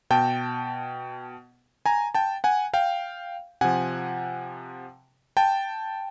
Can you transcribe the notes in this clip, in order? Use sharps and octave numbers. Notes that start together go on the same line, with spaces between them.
B2 G5 A5
G#5 A#5
G5 A5
F#5 G#5
F5 G5
C3 F3 F#5 G#5
G5 A5